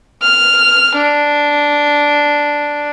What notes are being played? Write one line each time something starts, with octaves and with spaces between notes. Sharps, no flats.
F6
D4